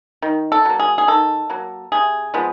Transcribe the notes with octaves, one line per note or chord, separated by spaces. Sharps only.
D#3
A4
F#3 A#3
G#4
G#4
D#3 A4
F#3 A#3
C3 G#4
F3 G#3 B3